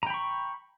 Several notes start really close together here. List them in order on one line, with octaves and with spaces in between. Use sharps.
A#5 G5 B5 C#6